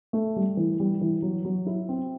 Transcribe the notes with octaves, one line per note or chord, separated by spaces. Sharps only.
A3
G3
E3
G3
E3
F#3
F#3
E4
C4